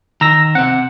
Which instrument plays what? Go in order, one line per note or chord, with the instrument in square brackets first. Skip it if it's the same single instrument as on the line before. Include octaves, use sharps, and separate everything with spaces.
[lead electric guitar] D#3 [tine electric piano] A#5 E6 A#6
[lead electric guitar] C3 C4 [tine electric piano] F#5